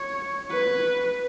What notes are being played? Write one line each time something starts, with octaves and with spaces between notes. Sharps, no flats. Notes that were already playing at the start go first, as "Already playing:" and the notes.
Already playing: C#5
B4